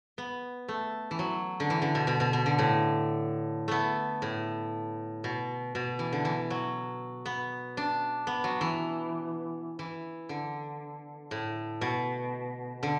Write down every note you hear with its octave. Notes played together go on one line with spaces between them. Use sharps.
B3
A3
E3
F#3
D3
E3
D3
B2
B2
B2
B2
D3
A2
A3 B3
A2
B2
B2
E3
D3
E3
F#3
B3
D4
B3
F#3
E3
E3
D3
A2
B2
D3